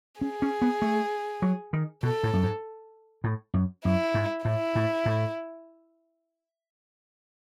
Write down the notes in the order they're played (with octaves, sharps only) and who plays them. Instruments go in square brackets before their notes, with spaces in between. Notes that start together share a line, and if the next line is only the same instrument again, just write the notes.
[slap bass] C#4 [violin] G#4
[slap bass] C#4
B3
A3
F#3
D#3
[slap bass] B2 [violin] A4
[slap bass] A2
F#2
G#2
A2
F#2
[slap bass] F#2 [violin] E4
[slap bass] G#2
[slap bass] A2 [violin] E4
[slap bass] A2
A2